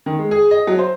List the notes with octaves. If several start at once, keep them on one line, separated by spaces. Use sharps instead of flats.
D#3
G#3
G#4
D#5
F#3
C5